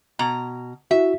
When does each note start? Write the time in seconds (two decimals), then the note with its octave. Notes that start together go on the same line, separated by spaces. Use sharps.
0.19 B2 A#5
0.91 E4 F#4 E5